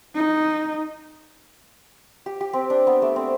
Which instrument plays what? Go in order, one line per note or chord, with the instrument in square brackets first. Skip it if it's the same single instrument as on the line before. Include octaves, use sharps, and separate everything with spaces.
[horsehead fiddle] D#4
[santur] G4
G4
C4
D4
B3
A3
C4